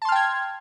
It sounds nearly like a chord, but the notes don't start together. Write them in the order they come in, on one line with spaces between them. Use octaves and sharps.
A5 C6 F6 G5 G#6